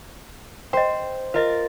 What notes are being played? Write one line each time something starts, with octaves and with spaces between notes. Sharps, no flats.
C5 D#5 G5
F4 A#4 B4 D#5 A6